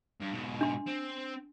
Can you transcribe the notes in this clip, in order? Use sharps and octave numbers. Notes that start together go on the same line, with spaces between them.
G2
G#2 B2
D4 C6
C4